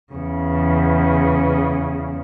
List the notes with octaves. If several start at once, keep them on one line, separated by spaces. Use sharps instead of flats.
E2 C#3